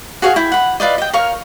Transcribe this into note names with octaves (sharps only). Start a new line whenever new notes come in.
F#4 G#4 C#5 F5
E4 G5
F#5 B5
F4 B4 D5 D#5
D#5 G5
A#4 C#5 F5 C#6